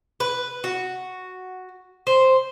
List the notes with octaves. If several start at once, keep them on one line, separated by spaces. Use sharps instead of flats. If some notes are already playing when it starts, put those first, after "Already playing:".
B4
F#4
C5